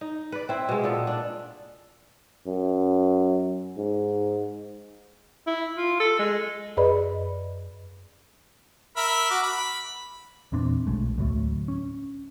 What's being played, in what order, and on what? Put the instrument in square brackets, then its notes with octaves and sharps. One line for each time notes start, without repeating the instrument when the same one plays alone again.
[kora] D#4
B4 D5
C4 E4
B2 G#3
A#2 B3 A4
D4
[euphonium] F#2
G#2
[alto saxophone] E4
F4
A4
G#3
[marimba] F#2 G#4 B4 D5 D#5 B5
[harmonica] A#4 E5 B5
F#4 D6
B5
[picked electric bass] E2 A#2 C4 D4
B1 G#3 A3
D2 A2 F#3 A3
C#4